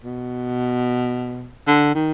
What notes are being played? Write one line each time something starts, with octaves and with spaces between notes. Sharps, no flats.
B2
D3
D#3